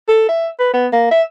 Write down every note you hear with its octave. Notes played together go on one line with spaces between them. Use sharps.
A4
E5
B4
B3
A#3
E5